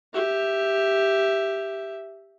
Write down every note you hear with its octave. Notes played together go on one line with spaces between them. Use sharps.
G4 E5